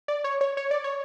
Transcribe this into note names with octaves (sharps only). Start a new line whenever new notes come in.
D5
C#5
C#5
C#5
D5
C#5